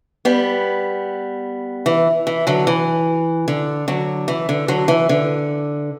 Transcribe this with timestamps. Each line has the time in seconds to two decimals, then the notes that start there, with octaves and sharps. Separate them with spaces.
0.25 G3 B3
1.86 E3
2.27 E3
2.47 D3 F#3
2.67 E3
3.48 D3
3.88 D3 F#3
4.28 E3
4.49 D3
4.68 D3 F#3
4.88 E3
5.09 D3